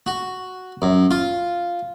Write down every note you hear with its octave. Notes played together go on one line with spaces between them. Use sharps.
F#4
F#2
F4